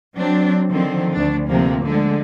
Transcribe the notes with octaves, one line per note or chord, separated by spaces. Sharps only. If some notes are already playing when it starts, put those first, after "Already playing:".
F#3 C4 D4
D3 D#3 F3 C4
D2 D4
D2 C3 F3 A#3
D3 G#3